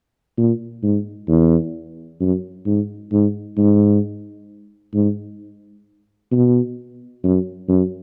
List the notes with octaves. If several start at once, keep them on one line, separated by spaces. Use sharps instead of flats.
A#2
G#2
E2
F#2
G#2
G#2
G#2
G#2
B2
F#2
F#2